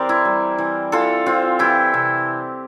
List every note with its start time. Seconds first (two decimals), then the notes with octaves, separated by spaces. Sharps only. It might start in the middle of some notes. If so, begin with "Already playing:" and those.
Already playing: E3 C4 G4 A#4 C5 D5
0.09 E4
0.25 G3
0.58 E3
0.92 E3 F4 A4
1.26 C4 F4
1.59 E3 E4 G4
1.94 C3